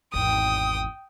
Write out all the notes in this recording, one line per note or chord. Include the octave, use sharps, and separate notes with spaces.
G#1 E2 G5 D#6